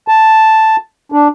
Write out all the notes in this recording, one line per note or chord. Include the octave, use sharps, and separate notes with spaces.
A5
D4